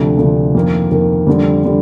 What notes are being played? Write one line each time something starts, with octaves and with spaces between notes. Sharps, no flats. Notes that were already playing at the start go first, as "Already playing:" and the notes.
Already playing: D2 C3 F3 A3 D4
D2 C3 F3 A3 D4
F2 D#3 A#3
F2 D#3 A#3
F2 D3 G3
D3 G3